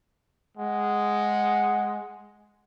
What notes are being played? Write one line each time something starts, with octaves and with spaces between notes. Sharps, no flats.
G#3 F#5